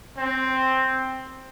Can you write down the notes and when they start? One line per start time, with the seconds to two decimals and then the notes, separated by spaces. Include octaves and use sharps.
0.17 C4